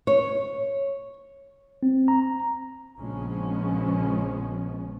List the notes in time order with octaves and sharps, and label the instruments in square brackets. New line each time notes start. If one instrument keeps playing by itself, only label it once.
[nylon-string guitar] C#5
[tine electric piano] C4
A#5
[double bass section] A#1 C#3 F3 G#3 B3 C#4